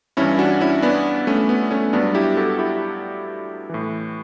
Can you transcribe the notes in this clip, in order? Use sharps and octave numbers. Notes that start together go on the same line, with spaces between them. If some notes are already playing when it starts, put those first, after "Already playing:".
G2 E3 C#4 E4
D4 F#4
C#4 E4
B3 D4
A3 C#4
B3
A3 C#4
G2 F#3 B3 D4
E4 G4
F#4 A4
E4 G4
A2 E3